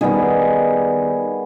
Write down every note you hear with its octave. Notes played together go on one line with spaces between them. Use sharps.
D#3 G3 B3 G#4